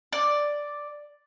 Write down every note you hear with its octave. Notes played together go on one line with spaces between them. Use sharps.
D5